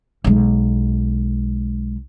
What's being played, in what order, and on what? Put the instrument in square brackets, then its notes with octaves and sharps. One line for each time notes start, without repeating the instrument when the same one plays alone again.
[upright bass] B1 G#3